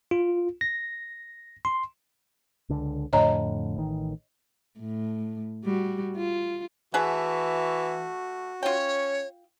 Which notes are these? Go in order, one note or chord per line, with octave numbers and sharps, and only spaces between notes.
F4
A#6
C6
C#2 D3
F2 A2 D3 C#5 D#5 A#5
A1 D#3
A2
G3 F#4
F4
E3 A3 F#4 G#4 F#5
C#4 F4 C#5 G5